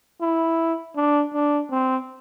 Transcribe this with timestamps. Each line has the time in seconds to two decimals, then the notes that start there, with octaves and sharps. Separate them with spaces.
0.21 E4
0.96 D4
1.34 D4
1.71 C4